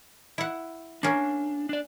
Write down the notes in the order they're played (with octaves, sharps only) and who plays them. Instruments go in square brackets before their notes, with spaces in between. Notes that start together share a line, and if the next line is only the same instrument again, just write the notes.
[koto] E4 F#5
[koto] A#3 C#4 [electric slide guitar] D4
[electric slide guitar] D4 D5